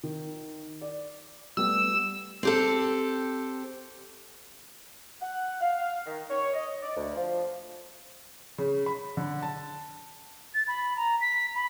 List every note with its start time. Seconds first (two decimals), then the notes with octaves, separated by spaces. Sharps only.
0.03 D#3
0.82 D5
1.57 G3 A3 B3 E6
2.43 C4 G4 A4
5.21 F#5
5.61 F5
6.05 D#3
6.29 C#5
6.53 D#5
6.82 D5
6.96 D2
7.15 F3
8.58 C#3
8.86 B5
9.17 D3
9.42 A5
10.54 A6
10.68 B5
10.97 A#5
11.21 B6
11.55 B5